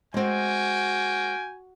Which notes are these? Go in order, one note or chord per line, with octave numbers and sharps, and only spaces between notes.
G#3 A#3 C4 F#4 G5 G#5